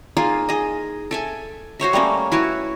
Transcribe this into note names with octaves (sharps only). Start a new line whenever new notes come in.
A#3 D#4 F4 G#4
G#4 D#5
A4 E5 G#5
F#4 C5 C#5 E5
G3 A3 A#3 C#4
E4 F#4 B4 C#5